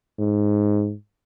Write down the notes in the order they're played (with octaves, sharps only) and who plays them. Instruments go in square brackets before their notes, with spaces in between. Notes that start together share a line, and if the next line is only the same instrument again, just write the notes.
[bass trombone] G#2